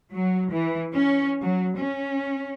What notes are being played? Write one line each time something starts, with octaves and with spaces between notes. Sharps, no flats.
F#3
E3
C#4
F#3
C#4